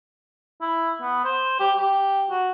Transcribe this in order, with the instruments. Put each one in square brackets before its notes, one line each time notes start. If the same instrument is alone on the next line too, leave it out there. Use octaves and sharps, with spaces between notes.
[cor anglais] E4
B3
C5
G4
G4
F#4